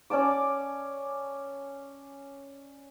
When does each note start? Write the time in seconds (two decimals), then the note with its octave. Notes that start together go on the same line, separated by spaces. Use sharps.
0.10 C#4 D5 A5 D6